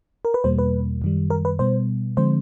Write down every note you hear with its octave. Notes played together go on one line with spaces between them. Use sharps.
A#4
B4
E2 B2 G3 A#3 C5
B4
F#2 D#3 G3
A#4
B4
B2 G3 B3 C5
D3 F3 G#3 C4 C5